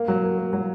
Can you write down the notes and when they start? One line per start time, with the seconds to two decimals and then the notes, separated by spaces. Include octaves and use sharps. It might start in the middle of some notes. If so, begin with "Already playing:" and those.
Already playing: A#3
0.08 F#3
0.23 A#3
0.38 A#3
0.53 F#3